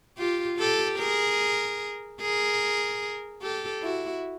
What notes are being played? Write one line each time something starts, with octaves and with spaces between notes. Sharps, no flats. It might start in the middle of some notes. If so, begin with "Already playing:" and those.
F4 G4
G4 A4
G#4 A#4
G#4 A#4
G4 A4
E4 F#4